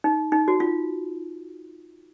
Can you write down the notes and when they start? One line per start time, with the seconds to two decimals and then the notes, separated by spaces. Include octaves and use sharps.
0.04 D#4
0.32 D#4
0.48 F#4
0.60 F4